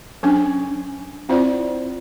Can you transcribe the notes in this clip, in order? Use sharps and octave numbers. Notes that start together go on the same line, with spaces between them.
F#3 C#4 D4 G#5 D6
C4 E4 F4 C5 D5